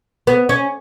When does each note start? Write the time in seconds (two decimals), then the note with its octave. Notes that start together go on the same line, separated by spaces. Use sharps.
0.27 B3
0.49 C#4